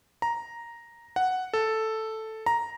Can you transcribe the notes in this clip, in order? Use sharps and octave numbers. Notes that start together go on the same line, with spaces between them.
A#5
F#5
A4
A#5